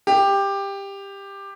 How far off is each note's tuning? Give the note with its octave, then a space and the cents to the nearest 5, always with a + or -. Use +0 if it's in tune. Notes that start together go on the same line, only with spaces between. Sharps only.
G4 +15